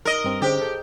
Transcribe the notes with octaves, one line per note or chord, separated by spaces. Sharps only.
A#4 D#5
G2 C4
D3 C#4 G4 G#4 C5
A4 G6